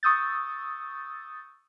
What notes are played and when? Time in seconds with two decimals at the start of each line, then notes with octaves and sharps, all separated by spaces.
0.03 C#6 D#6 E6 G6 A6